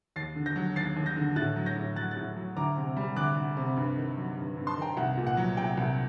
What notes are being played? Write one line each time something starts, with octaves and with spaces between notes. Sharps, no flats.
D#2 A6 C7
D3
G6 A#6
F#3
D#2 A6 C7
D#2
G6 A#6
D3
A2 F#6 A6
F#3
G6 A#6
A2
F#3 F#6 A6
F#6 A6
A2
F#3
D2 A#5 D6
C3
G3
D2 D6 F#6
D2
C3
G2
D#3
F#3
G2
G2
A5 C6
D#3 G5 A#5
C2 F#5
A#2
F#5
F#3
C2 G5
C2